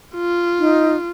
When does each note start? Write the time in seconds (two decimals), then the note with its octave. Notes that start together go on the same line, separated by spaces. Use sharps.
0.16 F4
0.59 D#4